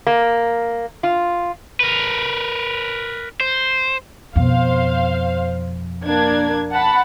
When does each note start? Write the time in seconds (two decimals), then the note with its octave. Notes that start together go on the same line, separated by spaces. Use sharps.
0.07 A#3
1.03 F4
1.80 A#4 B4
3.40 C5
4.36 F2 B2 C5 F5
6.06 A#3 D4 G#6
6.71 F#5 A5 B5